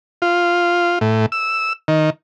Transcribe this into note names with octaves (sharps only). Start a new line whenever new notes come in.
F4
A2
E6
D#3